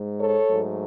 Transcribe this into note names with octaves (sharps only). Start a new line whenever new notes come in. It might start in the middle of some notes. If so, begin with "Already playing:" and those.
Already playing: G#2 G#3
A4 C#5
G#2 F#3 A3